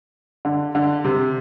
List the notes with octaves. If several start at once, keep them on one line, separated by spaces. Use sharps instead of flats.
D3
D3
C3